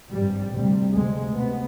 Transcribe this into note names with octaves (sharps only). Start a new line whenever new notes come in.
G#1 G2 G3
D2 C3 G3
D2 C3 G#3
C3 B3